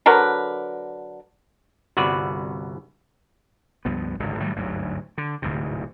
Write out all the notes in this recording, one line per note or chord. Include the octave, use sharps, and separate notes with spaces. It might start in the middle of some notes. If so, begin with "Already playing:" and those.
D3 F#3 A#4 B4
G1 C2 F#4 B4 D5
C#2 G2 F3 B3
G#1 C#2 G2 D3
A2 D#3 F#3 G3
G1 D2 G#2 F#3
D3
D1 D2 G#2 C3